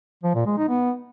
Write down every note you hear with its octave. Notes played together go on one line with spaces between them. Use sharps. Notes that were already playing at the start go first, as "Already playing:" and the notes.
F3
A#2
G#3
D#4
B3